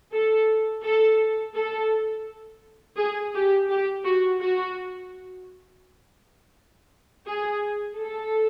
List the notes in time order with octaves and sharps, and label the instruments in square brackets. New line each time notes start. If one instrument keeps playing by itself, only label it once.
[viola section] A4
A4
A4
G#4
G4
G4
F#4
F#4
G#4
A4